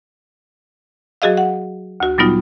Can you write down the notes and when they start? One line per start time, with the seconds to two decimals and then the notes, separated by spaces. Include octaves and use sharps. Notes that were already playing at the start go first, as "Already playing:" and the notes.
1.22 F#3 F#4 G#4 D#5 F5
1.37 F#5
2.00 D2 F#4
2.18 A#2 F#3 G3 B3 D#4 F4